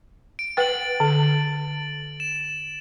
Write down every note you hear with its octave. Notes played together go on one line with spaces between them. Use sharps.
D7
B4 F#5 G5 A6 F#7
D3
E7